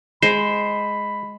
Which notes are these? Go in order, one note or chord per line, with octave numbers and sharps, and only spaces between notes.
G#3 C5 B5